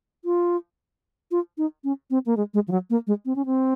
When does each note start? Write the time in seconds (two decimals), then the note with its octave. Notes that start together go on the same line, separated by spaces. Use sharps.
0.25 F4
1.31 F4
1.58 D#4
1.84 C#4
2.10 C4
2.26 A#3
2.37 G#3
2.54 G#3
2.68 F3
2.71 F#3
2.90 A#3
3.07 G#3
3.25 C4
3.36 C#4
3.46 C4